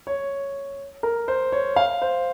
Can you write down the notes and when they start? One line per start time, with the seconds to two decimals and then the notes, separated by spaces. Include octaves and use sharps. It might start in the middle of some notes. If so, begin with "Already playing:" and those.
0.07 C#5
1.03 A#4
1.28 C5
1.52 C#5
1.76 F5
2.02 C5